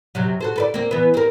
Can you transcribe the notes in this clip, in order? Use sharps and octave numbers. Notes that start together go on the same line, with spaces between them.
F#2 C3 F#3
F#4 A4 C5
A4 B4 D5
A#3 C4
E3 B3
C4 A#4